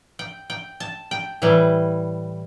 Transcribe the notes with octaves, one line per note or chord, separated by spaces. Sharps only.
G5
G5
A5
G5
A2 E3 G3